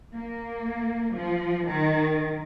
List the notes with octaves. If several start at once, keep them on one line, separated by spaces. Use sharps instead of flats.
A#3
F3
D#3